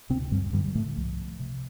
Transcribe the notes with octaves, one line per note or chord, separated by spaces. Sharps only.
D2 C3 C4
G2 G3
G2 D3 G3
G3
A2 A3
C2 F3
C3